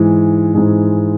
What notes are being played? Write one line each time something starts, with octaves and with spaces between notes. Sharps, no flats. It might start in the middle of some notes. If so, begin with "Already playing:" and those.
Already playing: G#2 E3 G#3
G#2 E3 G#3